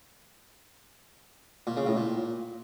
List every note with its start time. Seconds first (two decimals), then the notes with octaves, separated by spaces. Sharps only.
1.67 A#2
1.77 C#3
1.86 A2
1.96 A#2